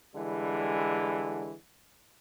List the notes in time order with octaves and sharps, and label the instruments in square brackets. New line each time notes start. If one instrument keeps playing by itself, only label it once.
[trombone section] D3 E3 G3 G#3